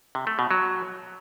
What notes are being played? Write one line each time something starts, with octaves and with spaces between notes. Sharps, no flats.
C3
A3
B2
F#3